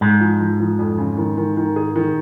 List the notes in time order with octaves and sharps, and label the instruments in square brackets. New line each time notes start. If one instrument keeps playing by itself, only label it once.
[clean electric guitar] G#2 [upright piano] G#3
[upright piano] F3
F3
F3
F2
C#3
D#3
D#3
D#3
G#4
D#3